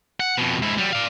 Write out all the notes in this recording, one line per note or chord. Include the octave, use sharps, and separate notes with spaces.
F#5
F2 B2
G#2 E4
F#3 G3
D5 F5